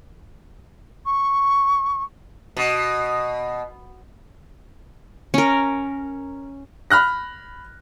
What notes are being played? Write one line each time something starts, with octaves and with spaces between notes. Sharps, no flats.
C#6
B2
C#4 A#4
B5 F6 F#6 A#6